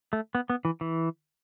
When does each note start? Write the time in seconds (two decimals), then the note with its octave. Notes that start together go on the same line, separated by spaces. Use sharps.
0.13 A3
0.35 B3
0.50 B3
0.65 E3
0.81 E3